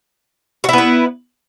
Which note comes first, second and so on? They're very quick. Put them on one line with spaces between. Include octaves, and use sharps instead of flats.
F#4 E4 B3 B4